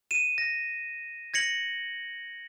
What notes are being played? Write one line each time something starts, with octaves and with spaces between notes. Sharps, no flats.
D#7 E7
A#6
G#6 A#6 C#7 F#7